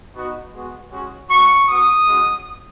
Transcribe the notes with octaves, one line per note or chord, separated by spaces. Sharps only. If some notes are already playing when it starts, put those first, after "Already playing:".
B3 D#4 F#4
G#3 B3 F#4
G#3 C#4 F#4
G#3 C#4 F#4 C#6
B3 F#4 D#6
G#3 C#4 F#4